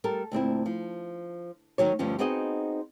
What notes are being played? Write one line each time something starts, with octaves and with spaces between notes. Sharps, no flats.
G3 A4 A#4
D2 A#2 C4 E4
F3
D2 G2 D#3 F#3 C#5
D2 G2 D3 F3 C#4
B3 C4 D#4 F#4 G#4 D#5